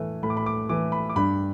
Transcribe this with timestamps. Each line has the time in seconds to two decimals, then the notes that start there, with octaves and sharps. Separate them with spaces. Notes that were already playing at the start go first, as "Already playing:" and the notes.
Already playing: A2 E3 A3
0.23 A2 B5
0.30 D6
0.37 B5
0.46 D6
0.69 E3 A3 D6
0.92 B5
1.09 D6
1.16 G2 B5